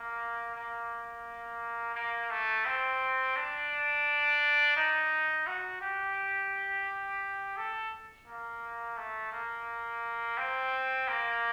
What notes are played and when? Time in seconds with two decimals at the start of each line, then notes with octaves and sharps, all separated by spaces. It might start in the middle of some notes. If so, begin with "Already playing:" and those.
Already playing: A#3
0.55 A#3
1.95 A#3
2.31 A3
2.65 C4
3.36 D4
4.77 D#4
5.47 F#4
5.81 G4
7.57 A4
8.27 A#3
8.97 A3
9.32 A#3
10.38 C4
11.08 A#3